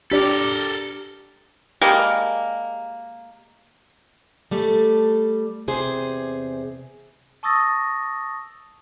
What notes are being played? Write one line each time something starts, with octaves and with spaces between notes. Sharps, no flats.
D4 G4 A4 A#4 D5
G3 G#3 A#3
G3 A3 A4
E2 C3 G#4 C5
A5 C#6 D#6 E6 A6 A#6